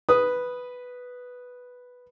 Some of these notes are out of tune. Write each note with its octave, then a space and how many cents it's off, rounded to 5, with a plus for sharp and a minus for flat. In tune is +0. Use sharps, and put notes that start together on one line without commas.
B4 +0 D#6 -5